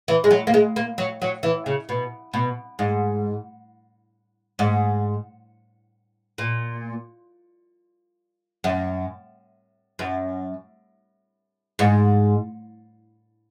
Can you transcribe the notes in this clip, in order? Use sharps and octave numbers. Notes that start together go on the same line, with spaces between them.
E3
G#3
F#3
A#3
G#3
A#3
F#3
F#3
E3
C#3
B2
B2
G#2
G#2
A#2
F#2
F#2
G#2